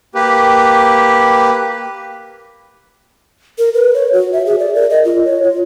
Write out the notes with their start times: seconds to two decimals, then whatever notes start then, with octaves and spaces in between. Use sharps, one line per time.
0.15 A#3 G4 B4
3.59 A#4
3.74 B4
3.94 C#5
4.13 F#4
4.33 E5
4.46 G#4
4.59 D5
4.75 A#4
4.90 D#5
5.05 F4
5.25 C#5
5.43 F4